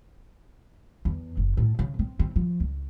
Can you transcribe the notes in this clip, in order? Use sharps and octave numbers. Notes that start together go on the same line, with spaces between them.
E2
F#1
A2
C#3
C4
C4
F3
C#2